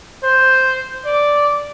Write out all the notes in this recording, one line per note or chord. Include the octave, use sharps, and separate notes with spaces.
C5
D5